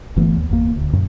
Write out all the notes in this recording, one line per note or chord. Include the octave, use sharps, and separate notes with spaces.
G1 E3 A3 B3
D#2
G1 E2 A#3
D1 D2
F#2 A#2